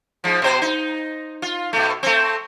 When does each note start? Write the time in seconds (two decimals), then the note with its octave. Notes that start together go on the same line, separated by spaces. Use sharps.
0.24 G#2 F3
0.42 B2 C5
0.62 D#4
1.42 F4
1.73 B2 A3
2.03 A3 C4